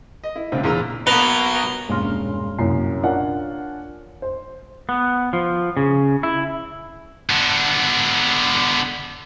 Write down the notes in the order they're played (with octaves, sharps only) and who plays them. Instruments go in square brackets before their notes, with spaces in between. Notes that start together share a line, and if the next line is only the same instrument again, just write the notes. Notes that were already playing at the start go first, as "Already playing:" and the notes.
[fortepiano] D#5
E4
C#2 A#2 D3 C4
E2 A#2 A#5 E6
[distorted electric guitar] B2 F#3 [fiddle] A#3 B3 [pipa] B4 [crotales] A#6 F7 G7
[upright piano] E1 G2 A#2 C#4 C6 F6
C2 F#2 A#2 C7
D4 F4 A#4 C#5 F#5 G#5
C5
[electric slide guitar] B3
F3
C#3
E4
[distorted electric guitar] D3 B3